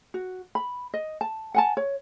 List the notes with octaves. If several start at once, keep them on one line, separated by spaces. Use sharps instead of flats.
F#4
B5
D#5
A5
F#5 G#5 A5
C#5